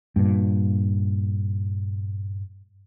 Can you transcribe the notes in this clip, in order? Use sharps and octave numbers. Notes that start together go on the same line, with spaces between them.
G2 A#2